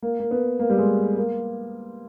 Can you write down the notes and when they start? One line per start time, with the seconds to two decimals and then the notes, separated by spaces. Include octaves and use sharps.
0.02 A#3
0.20 A#3
0.31 B3
0.59 A#3
0.70 G3
0.78 G#3
1.17 A#3